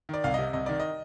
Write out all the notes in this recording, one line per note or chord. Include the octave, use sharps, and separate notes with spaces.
D#3 D5
C2 F5
C3 D#5
C2 D#5
D#3 D5
D#5